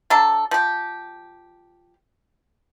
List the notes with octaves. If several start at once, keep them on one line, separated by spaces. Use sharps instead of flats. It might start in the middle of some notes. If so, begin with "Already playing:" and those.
F#3 D4 A4
F3 G4